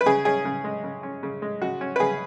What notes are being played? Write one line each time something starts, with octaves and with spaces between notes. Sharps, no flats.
B4
C#3 G#4
C#4 G#4
C#3
G#3
C#3
C#4
C#3
G#3
C#3 F#4
C#4
B4
C#3 G#4